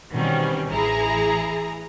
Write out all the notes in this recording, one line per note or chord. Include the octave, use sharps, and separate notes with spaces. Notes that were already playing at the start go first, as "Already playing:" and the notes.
B2 D#3 E3 G3 C4 C#4
A1 E3 E4 G#4 A#5